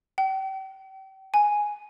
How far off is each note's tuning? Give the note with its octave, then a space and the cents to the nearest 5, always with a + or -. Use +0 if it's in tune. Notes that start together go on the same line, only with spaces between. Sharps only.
G5 -35
G#5 +0